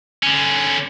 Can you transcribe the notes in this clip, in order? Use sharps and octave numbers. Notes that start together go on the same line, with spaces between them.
D3 C#4